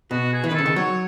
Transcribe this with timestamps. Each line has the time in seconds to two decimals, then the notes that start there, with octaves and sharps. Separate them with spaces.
0.11 B2 F#4
0.33 G#4
0.44 E3
0.48 B4
0.51 D#3
0.54 C#3 A4
0.66 D#3
0.76 F#3 C#5